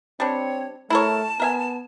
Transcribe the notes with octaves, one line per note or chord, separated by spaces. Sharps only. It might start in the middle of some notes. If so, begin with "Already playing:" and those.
G3 C4 D4 C#5
A3 E4 A#4 C#5 A5
B3 A#4 E5 G#5